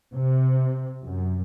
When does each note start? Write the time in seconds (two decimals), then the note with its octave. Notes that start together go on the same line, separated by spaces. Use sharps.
0.14 C3
1.03 F#2